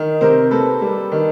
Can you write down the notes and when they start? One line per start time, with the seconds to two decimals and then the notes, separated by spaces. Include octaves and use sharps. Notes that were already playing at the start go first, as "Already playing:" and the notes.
Already playing: D#3
0.21 C3 A#4 C5
0.51 A#3 A4 B4
0.82 G3
1.12 D#3